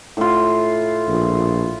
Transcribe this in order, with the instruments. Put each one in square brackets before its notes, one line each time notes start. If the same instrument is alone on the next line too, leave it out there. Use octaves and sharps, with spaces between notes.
[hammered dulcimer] A2 F4
[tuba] A#1